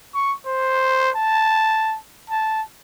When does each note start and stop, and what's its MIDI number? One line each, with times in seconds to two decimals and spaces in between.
0.15 0.34 85
0.46 1.11 72
1.16 1.97 81
2.30 2.62 81